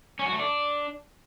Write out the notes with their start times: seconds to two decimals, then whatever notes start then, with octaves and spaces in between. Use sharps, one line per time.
0.19 C#4
0.26 F#4
0.33 A3
0.39 D4